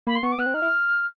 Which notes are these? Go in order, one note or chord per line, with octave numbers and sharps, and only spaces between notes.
A#3 B5
C6
B3 C#6
D6
B3 F#6
C4
D#4 F6
E4